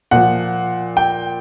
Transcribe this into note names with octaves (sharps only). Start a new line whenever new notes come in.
A#2 F3 F#5
G5